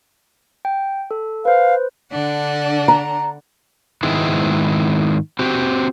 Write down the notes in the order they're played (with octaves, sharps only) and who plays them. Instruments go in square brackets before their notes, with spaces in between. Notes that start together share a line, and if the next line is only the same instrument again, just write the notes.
[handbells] G5
A4
[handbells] B4 C5 [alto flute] F5
[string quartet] D3 D4 F#5
[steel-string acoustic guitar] A#5
[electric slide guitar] G#2 D#3 G#3 B3 E4
C4 F#4 G4